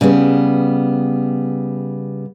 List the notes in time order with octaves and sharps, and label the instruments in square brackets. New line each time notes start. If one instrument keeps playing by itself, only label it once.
[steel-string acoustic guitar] C#3 G3 B3